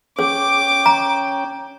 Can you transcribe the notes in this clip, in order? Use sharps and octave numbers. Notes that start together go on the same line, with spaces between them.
C#4 G#4 G5 D6
A#5